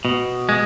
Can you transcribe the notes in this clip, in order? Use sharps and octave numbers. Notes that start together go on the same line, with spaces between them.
B2
G#3